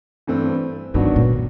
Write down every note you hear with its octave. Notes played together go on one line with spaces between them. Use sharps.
G2 E3 A3 C4
G2 D#3 F#3 B3 D4 F#4
A#2